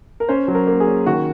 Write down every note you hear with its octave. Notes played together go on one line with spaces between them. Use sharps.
A#4
C#4 C5
F#3
A#4
A#3
G#4
C#4
D#3 F#4